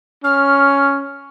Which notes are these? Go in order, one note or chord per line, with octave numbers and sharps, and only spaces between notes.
C#4 F6